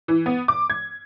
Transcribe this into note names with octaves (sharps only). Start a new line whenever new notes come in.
E3
B3
D6
G#6